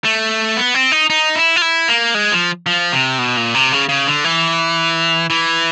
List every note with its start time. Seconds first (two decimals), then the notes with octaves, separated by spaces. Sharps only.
0.05 A3
0.57 B3
0.74 C4
0.92 D#4
1.10 D#4
1.35 E4
1.56 F4
1.62 E4
1.88 A#3
2.15 G#3
2.32 F3
2.66 F3
2.92 C3
3.19 B2
3.37 A#2
3.54 C3
3.72 C#3
3.89 C#3
4.07 D3
4.24 E3
5.30 E3